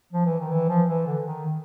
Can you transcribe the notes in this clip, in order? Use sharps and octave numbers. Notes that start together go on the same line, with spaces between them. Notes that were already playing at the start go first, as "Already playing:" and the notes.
F3
E3
D#3
E3
F3
E3
D3
D#3